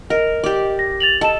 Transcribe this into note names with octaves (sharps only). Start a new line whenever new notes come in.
A#4 D#5
G4 D5
A#6
A6 F7 F#7
A4 D#5 A5 E7